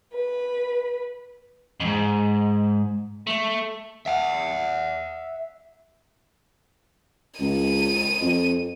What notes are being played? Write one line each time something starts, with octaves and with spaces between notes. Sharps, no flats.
B4
F2 G#2
A3
E5 F#5
C#2 D#7
F2